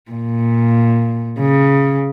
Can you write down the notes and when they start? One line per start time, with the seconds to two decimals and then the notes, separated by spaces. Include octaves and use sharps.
0.11 A#2
1.39 C#3